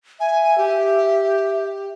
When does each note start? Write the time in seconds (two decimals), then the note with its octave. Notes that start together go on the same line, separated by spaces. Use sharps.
0.20 E5 G#5
0.58 G4